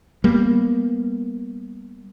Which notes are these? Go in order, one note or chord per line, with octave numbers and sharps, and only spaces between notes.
G3 A#3 B3